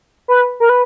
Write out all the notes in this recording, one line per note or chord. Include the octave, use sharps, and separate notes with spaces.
B4
A#4
B4